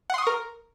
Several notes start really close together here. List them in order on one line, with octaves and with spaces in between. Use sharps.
F#5 C6 D#6 C#6 A#4